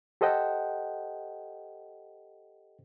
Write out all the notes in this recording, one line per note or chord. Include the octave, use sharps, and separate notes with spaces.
G4 A4 C5 D#5 F#5 G5